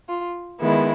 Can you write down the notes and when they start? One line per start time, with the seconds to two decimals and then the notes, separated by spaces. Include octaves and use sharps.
0.08 F4
0.60 D#3 G#3 B3 E4